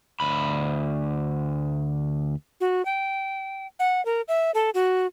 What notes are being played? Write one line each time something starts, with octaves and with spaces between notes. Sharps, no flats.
D2 B5
F#4
G5
F#5
A#4
E5
A4
F#4